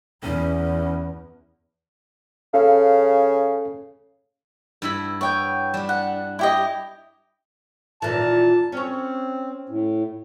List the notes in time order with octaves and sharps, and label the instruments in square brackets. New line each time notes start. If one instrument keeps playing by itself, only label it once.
[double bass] E2 [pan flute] C#4
[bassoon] C#3 [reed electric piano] C#4 A4 F5
[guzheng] G2 E4 B5
[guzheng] B3 [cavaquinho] C#5 G5
[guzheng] G3 D4
[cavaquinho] F#5
E4 G4 D#5
[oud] D#2 A#2 E3 [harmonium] A5
[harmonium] C4 [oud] C#4 C#5
[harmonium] A2